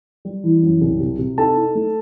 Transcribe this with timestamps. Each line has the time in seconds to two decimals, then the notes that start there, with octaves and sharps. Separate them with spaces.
0.25 G3
0.44 E3
0.63 F#2
0.81 C2
1.00 C3
1.19 C3
1.38 D#4 A4 A5
1.56 D#4
1.75 A3